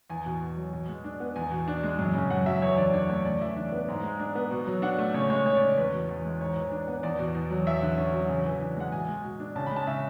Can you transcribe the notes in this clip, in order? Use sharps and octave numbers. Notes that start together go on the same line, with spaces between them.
E2 G#5
B2
E2
F#3
B2
G#3
D4
B3
E2 G#5
B2
D4
G#3
F#2
C#3
F#2 F#5
F#3 E5
E2 C#5
D3 D5
D4 C#5
A3 C#5
C#3 D5
E3 E5
D4
B3
G#2
G#3
D4
B3
B2
F#3
D4 F#5
A3
C#3 C#5
G#3 C#5
C#3 C#5
D5
C#4
E2 B4
B2
E2
G#3
G#2 C#5
E3
D4
B3
E2 D5
B2
E2
F#3
E2 E5
D3
C#4
F#3
C#3
E3
D4
G#3 F#5
B2 G#5
G#3
B2
D4
C#3 A5
B5
G#3
A5
C#3 E5